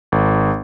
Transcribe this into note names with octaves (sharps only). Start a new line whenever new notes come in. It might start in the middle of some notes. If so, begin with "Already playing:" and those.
G#1